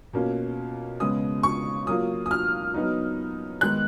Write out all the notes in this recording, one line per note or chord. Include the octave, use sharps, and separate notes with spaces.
B2 A#3 C#4 F4
C#3 G#3 B3 D#6
C#6
F#3 A#3 F4 D#6
D#6
F6
F#3 B3 D#4
D#3 G#3 B3 D#4 F#6